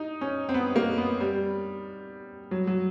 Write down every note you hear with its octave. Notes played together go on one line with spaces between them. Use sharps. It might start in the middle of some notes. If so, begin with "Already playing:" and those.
Already playing: D#4
C#4
C4
B3
A#3
B3
G3
F#3
F#3